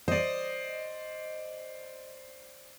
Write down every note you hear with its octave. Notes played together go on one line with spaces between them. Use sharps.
C5 D5 D#5